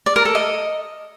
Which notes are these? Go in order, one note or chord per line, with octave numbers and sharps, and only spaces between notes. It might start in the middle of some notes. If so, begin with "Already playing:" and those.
D5
A#4
A4
D#5